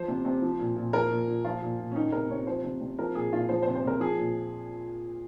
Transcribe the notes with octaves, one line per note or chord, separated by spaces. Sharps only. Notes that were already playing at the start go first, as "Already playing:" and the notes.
Already playing: F3 C5
C3
C3
F3
A#2
A#2
F3 A#4
A#2
A#2
F3 F4
A#2
A#2
C#4
D#3 D#4
C3 A#4
C3 C#5
F3 C5
C3
C3
F3 A#4
A#2 G#4
A#2 F4
F3 C5
C5
C3
C5
C3 A#4
F3 G#4
A#2